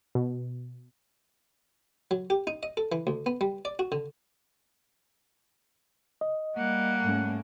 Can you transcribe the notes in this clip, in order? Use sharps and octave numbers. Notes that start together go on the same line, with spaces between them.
B2
F#3
G4
D#4
D#5
A4
E3
D2
B3
G3
D5
F#4
D3
D#5
G3 A#3 F#5
G#2 A3 C#4